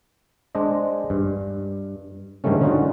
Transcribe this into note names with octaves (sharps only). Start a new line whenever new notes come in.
G#3 D4 C5 D#5
G2
G#2 D3 D#3 G3 A3 C#4
D3 C#4 D#4 F4 F#4